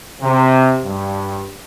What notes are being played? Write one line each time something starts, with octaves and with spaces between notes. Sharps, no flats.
C3
G2